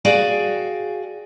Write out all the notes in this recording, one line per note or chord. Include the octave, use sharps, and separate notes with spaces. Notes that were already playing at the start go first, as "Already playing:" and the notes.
F#4 G#4 D5 F5 G5 G#5